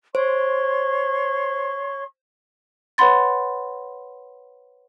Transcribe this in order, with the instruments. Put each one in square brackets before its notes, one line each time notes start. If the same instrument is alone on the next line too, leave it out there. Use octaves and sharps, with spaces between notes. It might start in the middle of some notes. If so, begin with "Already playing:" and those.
[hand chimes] C5 [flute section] C#5 C6 C#6
[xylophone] B4 C#5 F#5 B5 C6 A6